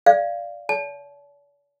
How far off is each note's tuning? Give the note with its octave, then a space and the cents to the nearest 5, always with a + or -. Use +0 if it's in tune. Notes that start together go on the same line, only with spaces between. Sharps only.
D5 +0 F5 -15
D5 -45 A5 -30